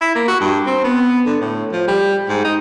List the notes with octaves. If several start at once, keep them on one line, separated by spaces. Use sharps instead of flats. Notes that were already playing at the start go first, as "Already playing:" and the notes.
E4
A#3
F#4
G2
C4
B3
D3
A2
F3
G3
G#2
D#4